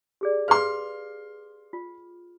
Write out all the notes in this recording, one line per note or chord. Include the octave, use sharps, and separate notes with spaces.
G4 G#4 D5
G#4 B4 F5 C6 F6
F4